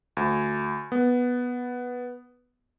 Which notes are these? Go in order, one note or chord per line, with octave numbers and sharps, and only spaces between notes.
D2
B3